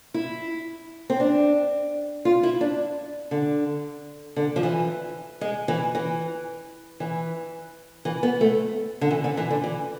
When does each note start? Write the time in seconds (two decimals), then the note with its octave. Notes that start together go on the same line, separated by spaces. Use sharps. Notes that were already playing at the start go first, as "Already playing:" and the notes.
0.14 E4
1.10 C4
1.20 D4
2.25 F4
2.43 E4
2.61 D4
3.31 D3
4.36 D3
4.56 F3
4.63 E3
5.41 G#3
5.68 E3
5.95 E3
7.00 E3
8.05 E3
8.23 B3
8.41 A3
9.01 D3
9.11 E3
9.24 D3
9.37 E3
9.50 D3
9.64 E3